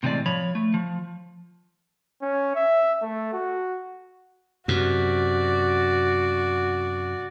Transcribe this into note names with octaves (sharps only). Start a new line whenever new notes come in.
A2 C3 E3 G#3 D5
F3 C#5 B5
A3
F3
C#4
E5
A3
F#4
F#2 C3 F#4 D5